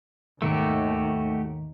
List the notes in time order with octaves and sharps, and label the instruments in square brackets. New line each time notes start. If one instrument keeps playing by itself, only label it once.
[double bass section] D#2 [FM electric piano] G#2 B2 D#3 [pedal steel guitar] A3 F#4 G4